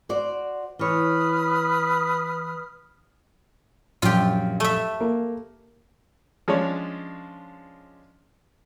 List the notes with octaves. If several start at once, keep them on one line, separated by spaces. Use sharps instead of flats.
F#4 C5 D5
E3 B4 C#5 D#6 F6
A#1 F#2 F4 G4
A3 E5
A#3
F3 G#3 C#4 D4 C#5